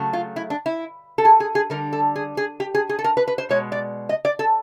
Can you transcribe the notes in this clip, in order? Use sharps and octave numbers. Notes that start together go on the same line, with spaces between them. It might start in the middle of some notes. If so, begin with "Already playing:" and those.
Already playing: C#3 F#3 A3
F4
E4
D4
E4
A4
G#4
G#4
G#4
D3 G3 A#4
A4
G#4
G#4
G4
G#4
G#4
A4
A#4
B4
B4
C5
B2 G#3 C#5
D5
D#5
D5
A4